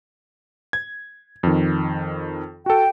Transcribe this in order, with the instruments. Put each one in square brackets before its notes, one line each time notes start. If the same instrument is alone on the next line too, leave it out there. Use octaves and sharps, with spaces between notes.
[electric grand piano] G#6
F2 D#3
[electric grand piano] F#4 A4 [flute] G5